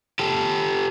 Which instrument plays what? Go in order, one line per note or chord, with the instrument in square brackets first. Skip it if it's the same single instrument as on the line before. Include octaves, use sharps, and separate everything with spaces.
[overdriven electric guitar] G4 A4